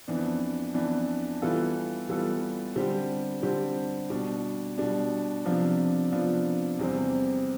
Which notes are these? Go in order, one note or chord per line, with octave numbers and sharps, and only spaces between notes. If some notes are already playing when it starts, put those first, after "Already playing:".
F2 E3 B3 D4
F2 E3 B3 D4
E3 G3 B3 F4 A4
E3 G3 B3 F4 A4
D3 G3 C4 G4
D3 G3 C4 G4
B2 G3 D4
B2 G3 D4
C3 F3 B3 D4 F4
C3 F3 B3 D4 F4
E2 C3 G3 C4